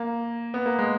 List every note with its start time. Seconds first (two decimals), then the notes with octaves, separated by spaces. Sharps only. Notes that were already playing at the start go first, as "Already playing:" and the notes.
Already playing: A#3
0.54 B3
0.66 A#3
0.79 G#3